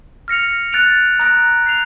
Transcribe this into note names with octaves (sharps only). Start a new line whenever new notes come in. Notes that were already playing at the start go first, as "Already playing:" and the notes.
F6 A#6 C#7 F7
F#6 A6 D7 F7
A#5 D#6 F#6 A#6 D7
G6 C7 F7